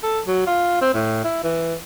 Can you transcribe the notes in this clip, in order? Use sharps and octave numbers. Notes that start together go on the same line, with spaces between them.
A4
F#3
F4
C4
A2
E4
E3